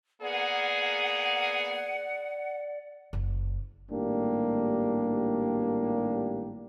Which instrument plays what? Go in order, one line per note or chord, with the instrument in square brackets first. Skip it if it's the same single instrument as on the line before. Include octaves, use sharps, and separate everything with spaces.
[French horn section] A#3 B3 G#4 [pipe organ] D5 [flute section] F#5
[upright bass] F#1
[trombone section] G#1 A2 G3 A#3 D4 G4